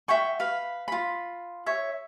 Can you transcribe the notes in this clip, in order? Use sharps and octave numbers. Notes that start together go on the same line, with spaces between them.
E5 F#5 G5 C#6
B4 F5 B5
F4 B5
C#5 E5